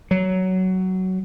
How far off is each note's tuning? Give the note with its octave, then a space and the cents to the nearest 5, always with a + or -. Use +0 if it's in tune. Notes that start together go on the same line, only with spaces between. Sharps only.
F#3 +15